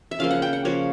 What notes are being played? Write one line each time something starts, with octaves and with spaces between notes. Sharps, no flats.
E5
C#3 F3 A#3 F5
F#5
G5
F#5
C#3 F3 A#3 C#5